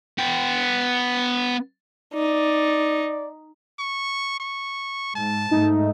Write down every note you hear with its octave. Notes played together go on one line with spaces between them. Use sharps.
B3 G5
D#4 D5
C#6
C#6
G#2 A5
G#2 A3 D#4